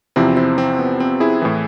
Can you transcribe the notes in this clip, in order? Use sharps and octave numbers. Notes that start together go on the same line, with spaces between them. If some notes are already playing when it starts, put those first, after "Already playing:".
E2 C3 F3 C4 E4
C4 E4
C4
B3
C4
E4 G#4
A2 E3